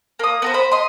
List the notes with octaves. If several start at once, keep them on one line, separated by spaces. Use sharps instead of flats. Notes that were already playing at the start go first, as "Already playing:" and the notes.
A#3 D#6
B3 A#4 C5
C5 B5
D#5 C6